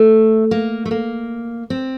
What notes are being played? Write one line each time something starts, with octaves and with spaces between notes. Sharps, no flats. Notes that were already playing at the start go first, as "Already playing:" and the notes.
Already playing: A3
A#3
A3
A#3
C4